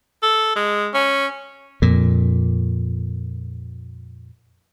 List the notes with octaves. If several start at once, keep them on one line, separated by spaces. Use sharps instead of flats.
A4
G#3
C#4
F2 A#2